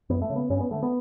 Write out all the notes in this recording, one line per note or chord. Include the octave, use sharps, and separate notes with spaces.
F#2 B3
A3
C#3
B3
G2 C#4
B3
D3 A3
B3